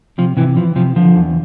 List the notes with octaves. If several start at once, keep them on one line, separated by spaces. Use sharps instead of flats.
C3 F3
C3 E3
E3 F3
C3 F3
D3 F3
E2